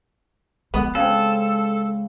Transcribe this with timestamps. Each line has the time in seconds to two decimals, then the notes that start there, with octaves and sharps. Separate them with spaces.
0.74 G#3 B3
0.95 C#3 C4 A4